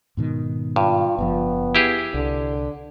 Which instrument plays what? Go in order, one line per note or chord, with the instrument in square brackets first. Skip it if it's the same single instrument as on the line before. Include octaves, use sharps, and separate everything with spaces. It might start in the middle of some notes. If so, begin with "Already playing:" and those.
[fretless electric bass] G#2 B2 D#3
[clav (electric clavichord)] G2 [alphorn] F4
[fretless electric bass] F#1 A2 F3 [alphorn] B3
[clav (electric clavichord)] E4 G4 G#4
[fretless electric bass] C2 [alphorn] D3